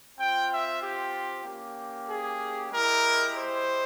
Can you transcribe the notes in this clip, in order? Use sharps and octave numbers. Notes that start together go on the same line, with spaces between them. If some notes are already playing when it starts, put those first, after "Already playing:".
C4 F4 G5
E5
G4
A#3 C#4 G4
G#4
G#3 E4 G4 A#4
C5